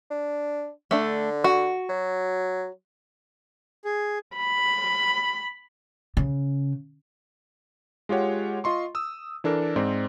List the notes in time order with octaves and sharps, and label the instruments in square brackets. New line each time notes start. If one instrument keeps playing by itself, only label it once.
[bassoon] D4
[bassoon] D3 [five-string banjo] A3 D4
[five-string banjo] F#4
[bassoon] F#3
[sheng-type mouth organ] G#4
[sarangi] B5
[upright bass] C#3
[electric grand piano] G#3 F4 G4 C#5 F#5
F4 D#5 C6 C#6
D#6 E6
E3 D4 A4 A#4
G#2 C4 D5